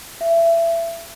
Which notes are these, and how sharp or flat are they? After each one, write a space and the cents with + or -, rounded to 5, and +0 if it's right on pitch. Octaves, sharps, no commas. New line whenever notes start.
E5 +25